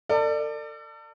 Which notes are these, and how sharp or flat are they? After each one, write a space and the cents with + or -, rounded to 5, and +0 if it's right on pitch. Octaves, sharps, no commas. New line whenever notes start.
A4 +40 D5 +25